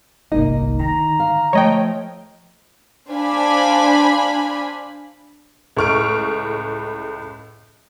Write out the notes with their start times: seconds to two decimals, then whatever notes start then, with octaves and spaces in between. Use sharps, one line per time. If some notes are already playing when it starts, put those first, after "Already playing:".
0.32 G1 C2 A#3 D#4 D#5
0.79 D3 D#3 A#5
1.20 F5
1.53 F3 A3 C#5 D#5 G5
3.10 D4 C5 F5 G#5 B5
5.77 C#2 A2 C#6 F6 D7